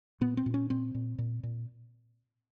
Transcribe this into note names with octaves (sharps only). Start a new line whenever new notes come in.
A#2 B3
C4
A#2
C#4
A#2 C4
A#2
A#2
A#2